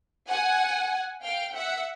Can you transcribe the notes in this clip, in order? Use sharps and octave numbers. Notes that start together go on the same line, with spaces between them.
F#5 G#5
F5 G5
E5 F#5